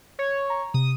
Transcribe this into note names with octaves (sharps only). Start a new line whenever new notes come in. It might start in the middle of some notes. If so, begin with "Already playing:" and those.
C#5
A#5
C3 D#6